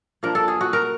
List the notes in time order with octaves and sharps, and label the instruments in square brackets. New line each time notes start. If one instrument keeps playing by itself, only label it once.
[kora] F3 A#3 D4 A#4
A4
G#4
F#4
A#4